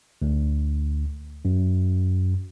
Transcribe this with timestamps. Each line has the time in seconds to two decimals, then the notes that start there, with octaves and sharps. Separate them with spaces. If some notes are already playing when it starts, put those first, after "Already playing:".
0.22 D2
1.45 F#2